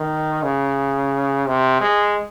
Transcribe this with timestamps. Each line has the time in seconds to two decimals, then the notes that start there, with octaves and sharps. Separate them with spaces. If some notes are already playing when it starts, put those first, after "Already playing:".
Already playing: D#3
0.43 C#3
1.46 C3
1.81 G#3